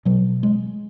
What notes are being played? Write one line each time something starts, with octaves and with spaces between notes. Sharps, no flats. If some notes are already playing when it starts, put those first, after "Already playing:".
B2 F#3
G#3